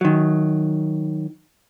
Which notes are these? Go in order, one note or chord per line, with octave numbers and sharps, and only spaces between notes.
D#3 F#3